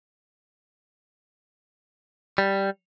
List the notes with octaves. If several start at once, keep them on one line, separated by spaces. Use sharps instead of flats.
G3